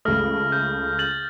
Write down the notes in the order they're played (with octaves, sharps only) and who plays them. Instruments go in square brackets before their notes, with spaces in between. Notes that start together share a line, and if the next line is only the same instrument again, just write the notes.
[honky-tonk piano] C#2 A3 [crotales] D#6 F6 A#6
[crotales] G6
G6 A6 F#7